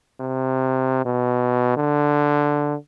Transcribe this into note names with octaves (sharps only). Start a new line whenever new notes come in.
C3
B2
D3